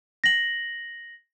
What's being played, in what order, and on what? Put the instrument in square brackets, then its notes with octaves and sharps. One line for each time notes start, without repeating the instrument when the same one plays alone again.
[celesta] A#6 F#7